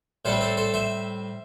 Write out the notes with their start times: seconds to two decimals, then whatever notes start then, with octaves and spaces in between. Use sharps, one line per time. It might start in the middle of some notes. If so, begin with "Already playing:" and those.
0.25 A2 G3 C4 A4 C5
0.41 A4 C5
0.57 A4 C5
0.74 C5 E5